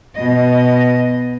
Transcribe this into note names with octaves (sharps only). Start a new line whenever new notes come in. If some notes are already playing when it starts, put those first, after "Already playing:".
B2 D#5